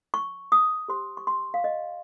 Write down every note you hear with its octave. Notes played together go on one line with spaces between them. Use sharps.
C#6
D#6
G4 C5 C6
C#6
C6
F5
D#5